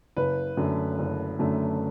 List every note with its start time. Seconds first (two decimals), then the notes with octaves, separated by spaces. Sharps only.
0.17 F#1 B4
0.57 F#2 D3 A3
0.99 F#1
1.39 F#2 D3 A3